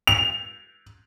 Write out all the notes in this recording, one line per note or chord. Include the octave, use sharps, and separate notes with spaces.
F7